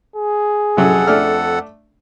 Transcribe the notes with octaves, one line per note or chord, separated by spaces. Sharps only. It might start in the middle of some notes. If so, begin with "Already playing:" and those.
G#4
F2 C3 F#3 C#4 A4 F#5
A3 D4 F6